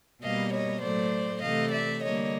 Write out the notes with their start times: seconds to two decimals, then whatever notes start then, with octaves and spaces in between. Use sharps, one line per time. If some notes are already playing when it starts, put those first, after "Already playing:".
0.22 B2 G3 A#3 D#5 F5
0.52 C#5 D#5
0.82 A2 F#3 A3 C5 D5
1.42 C3 E3 A3 D#5 F5
1.72 D5 E5
2.01 D3 G3 A#3 C#5 D#5